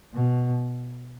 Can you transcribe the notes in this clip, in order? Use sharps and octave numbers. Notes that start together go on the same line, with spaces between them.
B2